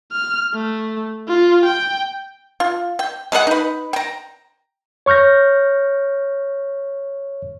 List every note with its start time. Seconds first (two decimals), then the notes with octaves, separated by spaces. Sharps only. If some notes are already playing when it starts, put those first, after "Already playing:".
0.12 F6
0.54 A3
1.28 F4
1.65 G5
2.60 F4
2.99 G5
3.32 G#3 G#4 A#4 F#5
3.47 D#4 B4
3.93 G5 A#5
5.06 C#5 C#6 F6 G6 A#6